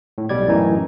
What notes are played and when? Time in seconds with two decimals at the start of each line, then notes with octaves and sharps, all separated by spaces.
0.18 A2
0.29 B1 B2 G3 D5 G#6
0.48 F#2 A2 E3 D#4